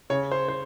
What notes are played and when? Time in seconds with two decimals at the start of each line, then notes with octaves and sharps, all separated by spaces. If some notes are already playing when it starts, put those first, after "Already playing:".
0.10 C#3 C#5
0.32 C5
0.48 C5